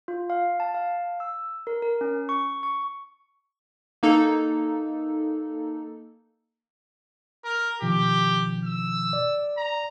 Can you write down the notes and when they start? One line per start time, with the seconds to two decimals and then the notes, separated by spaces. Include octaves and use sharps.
0.08 F4
0.30 F5
0.60 A5
0.74 F5
1.20 E6
1.67 A#4
1.82 A#4
2.01 C#4
2.29 C#6
2.63 C#6
4.03 A#3 D#4 A4
7.44 A#4
7.82 B2 D#3 F3 G4
8.65 E6
9.13 D5
9.57 A#5